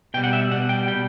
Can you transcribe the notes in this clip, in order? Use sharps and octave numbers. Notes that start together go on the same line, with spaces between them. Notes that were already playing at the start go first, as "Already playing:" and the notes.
B2 G3 G5
F#5
E5
B2 G3 F#5
G5
B2 G3 G5